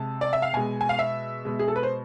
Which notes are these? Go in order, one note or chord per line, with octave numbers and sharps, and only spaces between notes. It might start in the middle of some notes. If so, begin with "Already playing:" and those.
Already playing: C3 G#3 A5
D5
E5
F5
B2 G#3 G#5
G#5
F5
E5
B2 G#3
G#4
A4
B4
C5